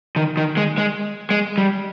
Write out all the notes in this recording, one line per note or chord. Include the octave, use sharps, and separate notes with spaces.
D#3
D#3
G#3
G#3
G#3
G3